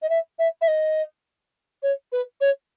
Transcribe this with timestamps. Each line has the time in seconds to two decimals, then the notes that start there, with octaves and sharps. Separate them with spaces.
0.02 D#5
0.09 E5
0.39 E5
0.61 E5
0.68 D#5
1.83 C#5
2.12 B4
2.41 C#5